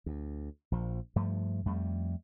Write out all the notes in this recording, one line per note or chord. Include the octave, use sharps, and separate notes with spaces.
D2
A#1 F3
G2 F3 A3
F2 G3 A3